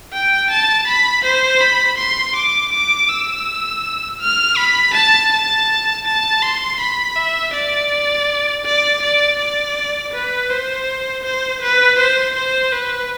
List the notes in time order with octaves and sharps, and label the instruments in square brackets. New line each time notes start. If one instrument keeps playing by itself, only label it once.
[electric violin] G5
A5
B5
C5
B5
C6
D6
D6
E6
F6
B5
A5
A5
A5
C6
B5
E5
D5
D5
D5
D5
B4
C5
C5
B4
C5
C5
B4